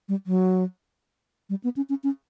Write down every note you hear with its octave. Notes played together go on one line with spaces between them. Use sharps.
G3
F#3
G3
B3
C#4
C#4
C#4